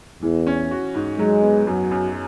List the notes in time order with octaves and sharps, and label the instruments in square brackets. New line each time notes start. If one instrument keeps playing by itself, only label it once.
[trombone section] E2 [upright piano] E3
[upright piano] C#4
F#4
G#2
[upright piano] F#3 [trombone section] G#3
[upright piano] B3
[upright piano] F#2 [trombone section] F#3
[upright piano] F#2